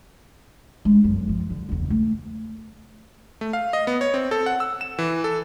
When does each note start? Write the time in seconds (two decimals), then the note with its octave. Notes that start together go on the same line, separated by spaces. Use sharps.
0.85 G#3 D4
1.04 G1 F#2
1.29 F3
1.50 D3
1.69 F#1 E2
1.90 A3
3.41 A3
3.53 F5
3.73 D#5
3.87 B3
4.01 C#5
4.14 C4
4.31 A4
4.46 F#5
4.60 E6
4.81 E7
4.98 E3
5.24 A4